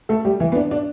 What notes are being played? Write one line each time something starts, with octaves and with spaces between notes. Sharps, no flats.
A3 A4
G3 G4
E3 E4
B3
D4
D4